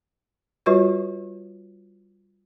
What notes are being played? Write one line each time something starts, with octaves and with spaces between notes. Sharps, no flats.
G3 F4 F#4 B4 C#5 C#6